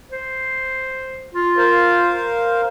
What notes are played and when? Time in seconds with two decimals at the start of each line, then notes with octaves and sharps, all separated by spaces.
0.11 C5
1.34 F4
1.57 A#4 C5 F5